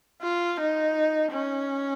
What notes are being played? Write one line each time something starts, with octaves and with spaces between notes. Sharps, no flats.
F4
D#4
C#4